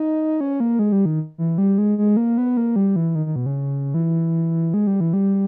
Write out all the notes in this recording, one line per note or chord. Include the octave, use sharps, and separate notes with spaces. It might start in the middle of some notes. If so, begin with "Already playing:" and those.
Already playing: D#4
C#4
A#3
G#3
G3
D#3
E3
G3
G#3
G#3
A#3
B3
A#3
G3
E3
D#3
D#3
B2
C#3
E3
G#3
G3
E3
G3